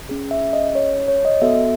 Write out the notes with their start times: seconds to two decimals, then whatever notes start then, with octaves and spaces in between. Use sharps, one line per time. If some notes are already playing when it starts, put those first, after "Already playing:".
0.09 C#4 G#4
0.31 E5
0.53 D#5
0.75 C#5
1.08 C#5
1.25 D#5
1.42 B3 F#4 A4 E5